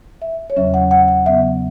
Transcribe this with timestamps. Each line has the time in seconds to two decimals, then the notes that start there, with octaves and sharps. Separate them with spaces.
0.22 E5
0.50 C#5
0.56 E2 C#3 F#3 C#4 E5
0.74 F#5
0.91 F#5
1.08 F#5
1.26 C#3 F#3 B3 E5